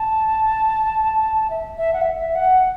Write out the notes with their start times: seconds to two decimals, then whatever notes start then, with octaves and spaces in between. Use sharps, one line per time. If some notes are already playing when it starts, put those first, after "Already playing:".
Already playing: A5
1.50 E5
1.78 E5
1.93 F#5
2.02 E5
2.17 E5
2.35 F#5